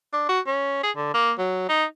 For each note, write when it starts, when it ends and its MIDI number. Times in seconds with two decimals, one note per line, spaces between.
0.13 0.27 62
0.29 0.40 66
0.47 0.82 61
0.83 0.91 68
0.96 1.14 50
1.14 1.32 58
1.39 1.66 54
1.69 1.85 63